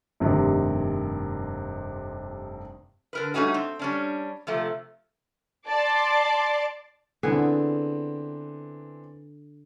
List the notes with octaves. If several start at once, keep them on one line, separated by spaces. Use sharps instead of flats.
F1 G2 C3 D#3
D3 A#4 B4
G3 A3 C#4 D#4 F#4
C4
G3 C#4 D4
C3 F3 A3
D5 A5 C6 D6 A6
D3 E3 B3 C4 D4 G#4